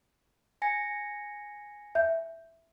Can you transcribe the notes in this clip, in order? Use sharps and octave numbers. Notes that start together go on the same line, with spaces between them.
G#5 A#6 C#7
E5 G6